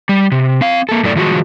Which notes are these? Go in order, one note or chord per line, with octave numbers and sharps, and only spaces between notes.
G3
C3
C4 F5
A#3 A4
F#2 A2 A4 D5
D#3 F3 G#3 F#4